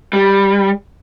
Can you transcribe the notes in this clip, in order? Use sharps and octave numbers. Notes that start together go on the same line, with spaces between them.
G3